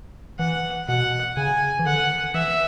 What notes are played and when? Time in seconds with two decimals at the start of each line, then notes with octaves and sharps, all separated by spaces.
0.39 E3 F#5
0.88 B2 F#5
1.36 C#3 G#5
1.79 E3
1.86 D3 F#5
2.34 E3 E5